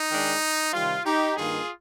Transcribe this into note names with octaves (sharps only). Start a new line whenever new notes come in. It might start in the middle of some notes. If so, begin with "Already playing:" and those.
Already playing: D#4
D#3 G#3 D4
C3 D#3 G3 F4
D#4 G4
G2 D#3 A#3 D#4 F4 G#4